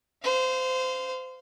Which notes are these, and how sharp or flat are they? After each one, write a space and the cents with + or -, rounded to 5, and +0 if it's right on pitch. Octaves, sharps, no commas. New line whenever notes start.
C5 -25 F5 +0